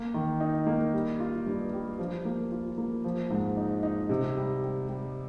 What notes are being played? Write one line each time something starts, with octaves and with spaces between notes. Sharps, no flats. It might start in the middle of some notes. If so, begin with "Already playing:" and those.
Already playing: A#3
D#3
D#4
A#3
G3
F4
G2
G3
F3
A#3
F4
A#3
F3
G#2
D#4
D#4
C3
G3
G3
G3